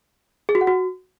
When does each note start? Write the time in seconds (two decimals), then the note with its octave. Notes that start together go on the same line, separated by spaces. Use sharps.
0.49 G#4
0.55 F#4
0.61 F#5
0.67 F#4